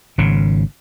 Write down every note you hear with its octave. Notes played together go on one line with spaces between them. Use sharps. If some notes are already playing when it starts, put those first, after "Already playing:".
G#1 C#3